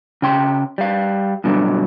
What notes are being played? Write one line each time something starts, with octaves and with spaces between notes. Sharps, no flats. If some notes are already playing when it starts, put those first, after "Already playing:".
C#3 G5 C6
G3 F5
G2 B2 D3 F#3